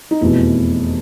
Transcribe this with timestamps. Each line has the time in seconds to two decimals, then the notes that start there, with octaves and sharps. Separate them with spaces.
0.11 D#4
0.21 F1 E2 B2 E4